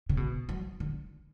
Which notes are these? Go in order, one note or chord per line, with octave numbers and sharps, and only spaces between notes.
C#3
B2
F#3
D3